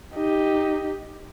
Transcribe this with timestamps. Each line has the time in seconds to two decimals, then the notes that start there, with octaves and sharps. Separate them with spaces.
0.15 D#4 G4